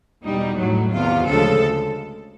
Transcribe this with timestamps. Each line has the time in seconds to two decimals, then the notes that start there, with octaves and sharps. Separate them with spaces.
0.24 E2 B2 G3 D#4
0.58 A2 F#3 A3
0.92 E2 C3 D#3 F4
1.25 D2 C#3 F3 G#3 A4